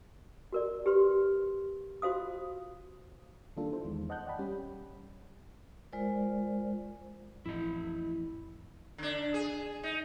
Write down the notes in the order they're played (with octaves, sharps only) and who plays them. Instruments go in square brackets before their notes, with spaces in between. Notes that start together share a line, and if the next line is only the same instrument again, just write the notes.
[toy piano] F#4 A#4 D5
G4 B4 C6
F4 F#4 C5 F5 D#6
[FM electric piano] D#3 G3 A#3 D4 F4 A4
B3 E4 A4 C5
E2 D#3 G#3
C5 D#5 F#5 A5 F#6 G6
D5 D#5 F#5 G5 A5 B5
G3 C#4 G4
[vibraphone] G#3 F4 A#4 C5 D5
[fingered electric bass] A1 F2 [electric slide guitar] E4 D#5
[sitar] D3 D4
G#4
D#4